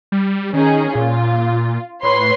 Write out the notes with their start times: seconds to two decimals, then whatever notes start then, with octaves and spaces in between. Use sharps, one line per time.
0.12 G3
0.54 D#3 C#4 D#4 G#4
0.95 A#2 F4
2.03 A2 B4 C#5 C6